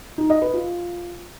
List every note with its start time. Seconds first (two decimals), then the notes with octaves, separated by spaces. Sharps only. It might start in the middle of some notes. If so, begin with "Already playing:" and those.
0.18 D#4
0.30 D#5
0.42 B4
0.54 F4